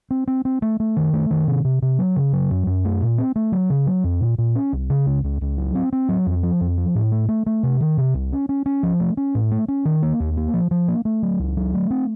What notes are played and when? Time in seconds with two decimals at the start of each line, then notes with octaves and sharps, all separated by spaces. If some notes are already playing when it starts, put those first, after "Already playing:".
0.11 C4
0.27 C4
0.45 C4
0.62 A3
0.80 A3
0.97 D#3
1.13 A3
1.31 D#3
1.48 C3
1.65 C3
1.82 C3
1.99 F#3
2.16 C#3
2.33 F#3
2.51 F#2
2.67 F#2
2.85 A3
3.02 A#2
3.18 C4
3.36 A3
3.52 F#3
3.70 C#3
3.87 F#3
4.04 F2
4.21 A#2
4.38 A#2
4.55 C#4
4.73 C2
4.90 C#3
5.06 C#2
5.24 C#2
5.41 C#2
5.58 F#3
5.75 C4
5.93 C4
6.09 F#3
6.26 F2
6.43 F3
6.61 F2
6.77 F3
6.95 A2
7.12 A3
7.29 A3
7.46 A3
7.63 C3
7.81 D#3
7.97 C3
8.14 C2
8.32 C#4
8.49 C#4
8.66 C#4
8.83 F3
9.00 A3
9.17 C#4
9.35 A2
9.51 A3
9.68 C#4
9.85 D#3
10.03 A#3
10.20 D#2
10.37 A#3
10.54 F3
10.71 F3
10.88 A#3
11.05 A3
11.23 F#3
11.39 C#2
11.57 F#3
11.74 A3
11.90 C4